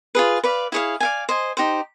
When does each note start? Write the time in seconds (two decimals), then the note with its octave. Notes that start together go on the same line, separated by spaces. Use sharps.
0.15 F4 G#4 B4
0.43 B4 D5 F5
0.72 E4 G#4 C#5 F5
1.00 D5 F5 G#5
1.29 C5 D#5 G#5
1.57 D#4 G4 C5